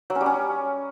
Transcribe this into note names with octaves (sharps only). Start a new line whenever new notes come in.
F#3
C#4
G3
C#4